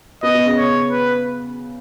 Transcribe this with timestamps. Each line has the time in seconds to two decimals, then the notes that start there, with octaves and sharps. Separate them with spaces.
0.23 B3 D#5
0.34 B3
0.46 C#3
0.58 C#5
0.91 B4